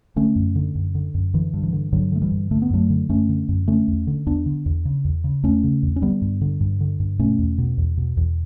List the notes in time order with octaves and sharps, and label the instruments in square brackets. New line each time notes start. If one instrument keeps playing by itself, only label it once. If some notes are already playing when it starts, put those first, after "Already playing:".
[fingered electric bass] D3 A3 C#4
F#2
D3
F#2
D3
F#2
D3 E3
G2
E3
D3
G2 D3 F#3
D3 A3
E3 G3
G2
D3 A3
B3
F#2 F#3 A3
D3
F#2 A3 C#4
D3
F#2
D3 A3 C#4
E2
D3
E2 B3 D4
D3
E2
C#3
E2
C#3
E2 A3 C#4
C#3
E2
C#4
D3 G3 B3
G2
D3
G2
D3
G2
B2 A3 C#4
E2
B2
E2
B2
E2